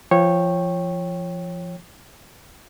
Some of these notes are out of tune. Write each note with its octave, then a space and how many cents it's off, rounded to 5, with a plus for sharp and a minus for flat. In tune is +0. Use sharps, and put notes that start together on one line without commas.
F3 -20 C#5 -15 G5 +0